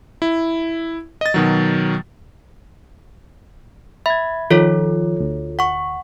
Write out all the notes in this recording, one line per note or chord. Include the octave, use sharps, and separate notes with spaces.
E4
D#5 A6
B2 D#3 F#3
E5 B5 G#6
D#3 F3 F4 A4 C#5
D2
F#5 C#6